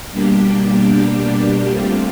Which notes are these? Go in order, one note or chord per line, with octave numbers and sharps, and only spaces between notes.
B2 G3 A#3 D4 G4
A3 C4 F4